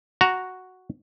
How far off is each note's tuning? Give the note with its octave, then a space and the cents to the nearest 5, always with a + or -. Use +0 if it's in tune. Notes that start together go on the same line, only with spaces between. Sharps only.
F#4 +0 A#5 +0